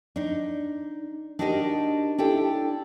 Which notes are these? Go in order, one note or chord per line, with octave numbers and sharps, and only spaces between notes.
D4 D#4
D4 D#4 F#4 G4 A#4 D#5
D4 E4 G4 A4 G5